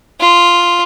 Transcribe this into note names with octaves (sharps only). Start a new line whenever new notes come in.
F4